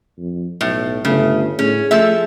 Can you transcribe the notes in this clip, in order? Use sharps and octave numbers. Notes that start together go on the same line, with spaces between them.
F2
B1 A2
G1 C#3 A3
A2 C#4 G#4
F3 A3 A4 E5